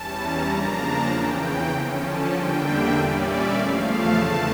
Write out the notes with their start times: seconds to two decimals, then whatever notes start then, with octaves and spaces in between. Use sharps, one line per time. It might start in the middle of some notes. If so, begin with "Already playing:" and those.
Already playing: E2 E3 G3 C#4 A5
0.15 A#5
0.46 C#3 F3 A#3 D4
0.77 A5
1.07 E2 C#3 E3 G5
1.69 D3 F3 C#4
2.00 A5
2.30 E2 D3 G3 A#3 D4 G5
2.61 E5
2.92 A#2 G3 C#4 D5
3.23 E5
3.53 E2 C#3 F3 A3 F5
3.84 A5
4.15 E2 D3 A3